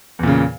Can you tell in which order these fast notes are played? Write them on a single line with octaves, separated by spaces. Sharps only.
E2 A#2 C#3